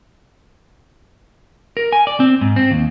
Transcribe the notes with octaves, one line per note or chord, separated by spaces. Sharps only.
A#4
G#5
D5
C4
G#2
C4
D#2